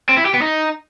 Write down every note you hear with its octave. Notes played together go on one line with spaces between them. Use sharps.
C4
E4
G4
B3
D#4